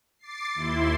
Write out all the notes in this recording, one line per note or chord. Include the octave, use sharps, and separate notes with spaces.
D6 A6 C7
D#2 E4 C6